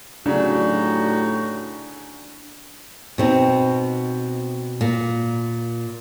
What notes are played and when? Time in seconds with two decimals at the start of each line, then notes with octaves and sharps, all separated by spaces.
0.26 A2 C#3 F#3 G3 D4 D#4 F#4
3.18 B2 C4 D#4
4.81 A#2